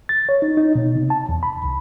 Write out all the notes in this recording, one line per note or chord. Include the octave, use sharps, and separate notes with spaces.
A6
C#5
D#4
D#4
B2
C3
A5
E2
B5
C2